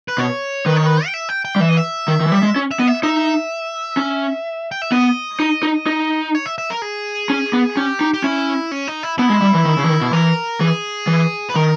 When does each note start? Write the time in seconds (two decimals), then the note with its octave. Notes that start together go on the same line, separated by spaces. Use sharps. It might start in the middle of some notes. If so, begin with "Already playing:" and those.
0.08 B4
0.18 B2 C#5
0.66 D#3 B4
0.76 C#5
0.86 B4
1.06 G5
1.14 E5
1.29 G5
1.45 G5
1.56 G3
1.60 E3 E5
1.69 D#5
1.77 E5
2.08 D#3
2.20 D#3
2.26 E3
2.32 G3
2.43 G#3
2.56 C#4
2.71 E5
2.79 B3 D#5
2.87 E5
3.03 D#4 E5
3.97 C#4
4.72 G5
4.82 E5
4.92 B3 D#5
5.40 D#4
5.63 D#4
5.86 D#4
6.35 C#5
6.46 E5
6.58 E5
6.70 A#4
6.82 G#4
7.30 C#4
7.53 B3
7.77 C#4 G4
8.01 D#4
8.14 G4
8.24 C#4 E4
8.71 C#4
8.88 D#4
9.03 E4
9.18 B3 E4
9.30 G#3
9.42 G3
9.54 E3
9.66 D#3
9.78 C#3
9.84 E3
9.89 D#3
10.01 B2
10.13 E3 A#4
10.60 E3 G#4
11.07 E3
11.50 B4
11.56 D#3 A#4